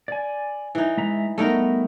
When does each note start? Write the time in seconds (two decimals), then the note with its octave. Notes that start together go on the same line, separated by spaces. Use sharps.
0.08 D5 G#5
0.75 E3 D#4
0.97 G#3 E5 A#5
1.38 G3 A3 B3 D#4 A#4